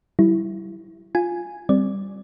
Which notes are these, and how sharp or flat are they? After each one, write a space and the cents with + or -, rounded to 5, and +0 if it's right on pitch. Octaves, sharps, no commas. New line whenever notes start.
G3 -35 E4 +0
F4 +0 G#5 +0
G3 +0 C4 +0 D5 +0